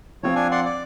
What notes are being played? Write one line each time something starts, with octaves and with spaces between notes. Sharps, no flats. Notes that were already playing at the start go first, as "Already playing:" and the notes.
F3 C4 F4 C#5
D4 G#5
D5 F#5 C6
D5